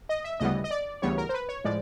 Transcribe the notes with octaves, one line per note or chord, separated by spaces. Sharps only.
D#5
E5
D2 C#3 E3 G3 B3 D#5
D#5
D5
D2 C#3 E3 G3 B3 C#5
A#4
C5
B4
C#5
A2 F3 G#3 D5